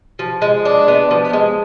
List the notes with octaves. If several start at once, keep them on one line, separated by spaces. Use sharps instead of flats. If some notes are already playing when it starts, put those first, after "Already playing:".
F3
G#3
D4
B3
F3
G#3